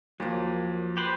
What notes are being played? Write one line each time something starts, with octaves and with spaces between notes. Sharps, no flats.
D#2 F3 F#3 A#3
G4 B4 C5